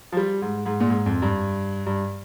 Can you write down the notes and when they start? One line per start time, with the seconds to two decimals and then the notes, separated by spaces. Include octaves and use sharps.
0.12 F3
0.17 G3
0.42 G#2
0.66 G#2
0.80 A#2
0.90 G#2
1.06 F2
1.22 G2
1.86 G2